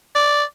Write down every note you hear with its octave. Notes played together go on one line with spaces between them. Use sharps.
D5